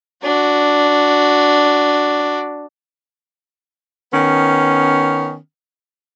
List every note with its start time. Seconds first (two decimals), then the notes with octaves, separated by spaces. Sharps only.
0.23 D4 F#4
4.12 D#3 B3 C#4